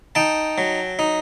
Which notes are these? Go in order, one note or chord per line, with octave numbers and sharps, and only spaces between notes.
D#4 G5 A5
F#3
D#4